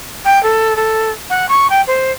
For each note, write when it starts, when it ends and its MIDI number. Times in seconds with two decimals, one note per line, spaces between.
0.25 0.42 79
0.43 0.74 69
0.76 1.10 69
1.30 1.46 78
1.49 1.68 85
1.70 1.82 79
1.87 2.12 72